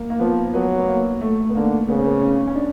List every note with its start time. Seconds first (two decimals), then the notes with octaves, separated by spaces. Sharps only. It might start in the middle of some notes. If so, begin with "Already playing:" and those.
Already playing: A#3
0.10 A#3
0.19 F3 B3
0.54 F#3 B3
0.78 B3
0.88 A#3
1.21 A3
1.49 B3
1.55 D3 A#3
1.89 C#3 B3
1.97 C4
2.06 B3
2.22 C#4
2.47 C#4
2.56 D4